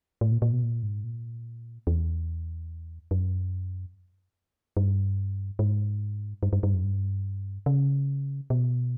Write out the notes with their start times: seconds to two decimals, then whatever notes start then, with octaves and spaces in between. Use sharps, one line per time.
0.21 A2
0.31 A#2
0.42 A#2
0.52 B2
0.63 A#2
0.83 G#2
1.04 A#2
1.87 E2
3.11 F#2
4.77 G2
5.59 G#2
6.43 G2
6.53 G2
6.63 G2
6.74 F#2
6.84 G2
7.66 C#3
8.50 B2